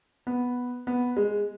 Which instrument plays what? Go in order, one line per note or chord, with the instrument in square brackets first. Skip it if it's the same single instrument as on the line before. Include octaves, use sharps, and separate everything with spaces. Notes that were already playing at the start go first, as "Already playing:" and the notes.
[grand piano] B3
B3
G#3